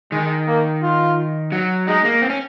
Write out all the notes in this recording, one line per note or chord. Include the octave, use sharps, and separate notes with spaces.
D#3 G#3
A#3
F4
F#3
G#3 D#4
A#3
C4
C#4